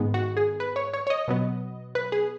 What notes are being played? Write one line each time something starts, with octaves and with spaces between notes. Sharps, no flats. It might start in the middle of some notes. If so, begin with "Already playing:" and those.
Already playing: G#2 D#3 G#3 B3
F#4
G#4
B4
C#5
C#5
C#5
D#5
B2 F#3 B3
B4
G#4